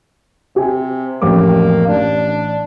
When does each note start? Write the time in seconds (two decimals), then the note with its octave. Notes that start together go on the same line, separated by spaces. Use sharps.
0.56 C3 G4 G#5
1.22 A1 F2 A#3 D6
1.89 A1 D4